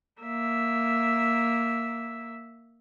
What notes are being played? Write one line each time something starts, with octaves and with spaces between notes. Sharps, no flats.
A#3 E5